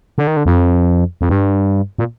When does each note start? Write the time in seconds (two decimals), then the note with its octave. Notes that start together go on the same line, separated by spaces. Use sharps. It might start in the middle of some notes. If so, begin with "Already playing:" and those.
0.18 D3
0.27 D#3
0.37 D3
0.46 F2
1.21 F2
1.29 G2
1.99 A#2